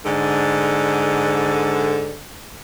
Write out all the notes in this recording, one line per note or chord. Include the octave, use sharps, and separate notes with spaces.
G#2 D3